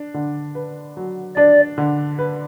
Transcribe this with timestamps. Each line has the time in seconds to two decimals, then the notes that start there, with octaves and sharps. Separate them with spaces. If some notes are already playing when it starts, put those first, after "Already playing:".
Already playing: D4
0.14 D3
0.55 B4
0.97 F#3
1.37 D4 D5
1.78 D3
2.19 B4